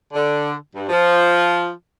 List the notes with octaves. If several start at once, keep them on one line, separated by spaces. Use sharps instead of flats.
D3
G2
F3